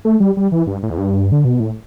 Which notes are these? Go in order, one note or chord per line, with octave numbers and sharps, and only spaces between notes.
A3
G3
G3
E3
G2
A2
E2
G2
D3
B2
A2